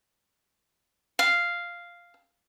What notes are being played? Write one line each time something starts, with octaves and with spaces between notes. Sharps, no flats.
F5